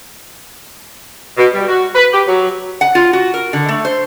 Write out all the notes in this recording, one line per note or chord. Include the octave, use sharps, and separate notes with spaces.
B2
G3
F#4
B4
G4
F#3
F#5
F4
F#4
A#4
D3
A3
C5